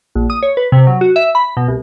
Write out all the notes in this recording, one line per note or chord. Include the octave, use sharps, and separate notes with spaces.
A#1
D#6
C#5
B4
C3
F#3
F#4
E5
B5
B2
C2